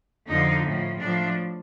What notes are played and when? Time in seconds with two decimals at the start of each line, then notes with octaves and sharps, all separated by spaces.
0.27 F2 D3 F3 D#4
0.63 A2 F3
0.99 A2 F3 D4